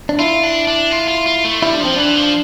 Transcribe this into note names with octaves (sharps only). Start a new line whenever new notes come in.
D4
E4 F4
D4
D4
F4
F4
F4
A3
G3 E4
D4
F3 C4
E3 D4
F3